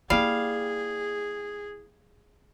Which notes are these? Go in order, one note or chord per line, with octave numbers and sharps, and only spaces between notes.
G3 A#3 E4 G#4 F5